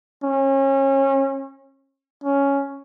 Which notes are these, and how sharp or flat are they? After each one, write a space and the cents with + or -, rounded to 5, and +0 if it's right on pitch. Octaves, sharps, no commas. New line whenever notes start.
C#4 -30
C#4 +5